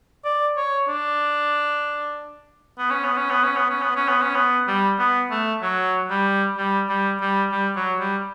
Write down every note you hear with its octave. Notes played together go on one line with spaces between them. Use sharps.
D5
C#5
D4
B3
C#4
B3
C#4
B3
C#4
B3
C#4
B3
C#4
B3
C#4
B3
G3
B3
A3
F#3
G3
G3
G3
G3
G3
F#3
G3